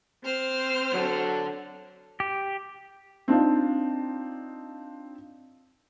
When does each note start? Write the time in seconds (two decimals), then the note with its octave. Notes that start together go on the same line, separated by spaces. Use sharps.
0.25 C4 C5 F6
0.93 D3 F#3 A4
2.20 G4
3.28 C4 D4 D#4 F4